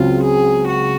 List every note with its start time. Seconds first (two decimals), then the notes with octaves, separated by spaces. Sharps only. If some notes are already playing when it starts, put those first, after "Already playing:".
Already playing: C#2 C#3 F#3 C4 F4
0.23 G#4
0.67 F#4